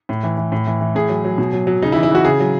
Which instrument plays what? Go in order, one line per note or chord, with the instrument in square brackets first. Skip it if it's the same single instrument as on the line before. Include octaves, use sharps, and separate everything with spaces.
[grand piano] A2
E3
E3
A2
E3
E3
A2 G#4
F#3
F#3
B2
F#3
F#3
C#3 D#4
E4
E3
E4
E3 F#4
C#3 G#4
F#3